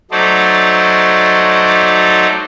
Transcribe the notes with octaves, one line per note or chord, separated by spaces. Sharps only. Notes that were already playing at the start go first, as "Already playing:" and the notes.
F#3 A3 D#4 C5 D5